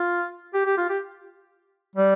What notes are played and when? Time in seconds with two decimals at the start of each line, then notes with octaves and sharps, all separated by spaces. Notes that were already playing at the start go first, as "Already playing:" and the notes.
Already playing: F4
0.54 G4
0.66 G4
0.77 F4
0.89 G4
1.95 G3